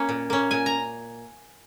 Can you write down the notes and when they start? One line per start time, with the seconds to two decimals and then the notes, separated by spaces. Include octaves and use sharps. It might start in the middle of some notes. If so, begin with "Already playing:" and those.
Already playing: A#3 C#4
0.09 A#2
0.30 A#3 C#4
0.51 A#2 G#5
0.66 A#5